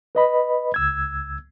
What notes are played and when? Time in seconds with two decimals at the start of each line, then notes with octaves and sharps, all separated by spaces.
0.15 B4 D#5 B5
0.74 C#2 E6 G#6